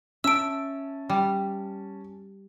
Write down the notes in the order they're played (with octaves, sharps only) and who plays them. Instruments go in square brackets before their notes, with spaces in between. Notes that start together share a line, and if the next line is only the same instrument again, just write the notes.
[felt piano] C#4 A5 [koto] E5 [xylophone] E6 D7
[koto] G3